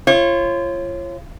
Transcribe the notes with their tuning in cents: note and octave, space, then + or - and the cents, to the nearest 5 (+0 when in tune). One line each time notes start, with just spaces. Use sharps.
F4 -30 C#5 -30